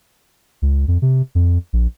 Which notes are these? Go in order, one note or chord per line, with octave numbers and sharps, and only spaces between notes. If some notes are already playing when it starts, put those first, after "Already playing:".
C#2
F2
C3
F2
A#1